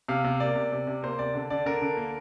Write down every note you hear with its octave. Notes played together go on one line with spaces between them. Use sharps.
C3 F5
C3
A#3 D5
C3
C3
C3
A#3 C5
C3 D5
D3
D3 D5
D3 A#4
D3
A#3